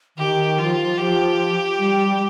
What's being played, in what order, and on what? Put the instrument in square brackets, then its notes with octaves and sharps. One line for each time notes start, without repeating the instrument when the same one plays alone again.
[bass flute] D#3 [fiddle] G4
[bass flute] F3 [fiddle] F4
[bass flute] F3 [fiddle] G4
[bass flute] G3